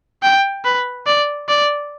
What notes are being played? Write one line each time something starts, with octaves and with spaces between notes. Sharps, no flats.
G5
B4
D5
D5